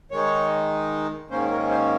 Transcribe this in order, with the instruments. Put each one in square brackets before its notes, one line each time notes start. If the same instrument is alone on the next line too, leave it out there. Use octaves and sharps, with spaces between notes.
[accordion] D#3 G#3 D#4 C#5
G#2 D#3 A#3 C#4 C5
A#4
C5